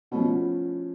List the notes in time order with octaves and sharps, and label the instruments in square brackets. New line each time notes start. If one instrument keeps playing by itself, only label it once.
[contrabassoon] B2 [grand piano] F3 A3 C#4 E4